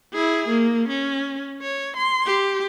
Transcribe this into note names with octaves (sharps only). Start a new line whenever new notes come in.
E4 G#4
A#3
C#4
C#5
C6
G4